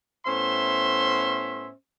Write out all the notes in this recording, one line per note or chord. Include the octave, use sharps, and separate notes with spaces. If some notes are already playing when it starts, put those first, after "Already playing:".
A2 B3 C#4 C5 E5 C6